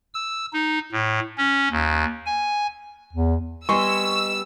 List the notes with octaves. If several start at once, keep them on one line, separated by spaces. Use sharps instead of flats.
E6
D#4
A2
C#4
D#2
G#5
E2
G3 B3 D#5 G#5 C6 C#6 E6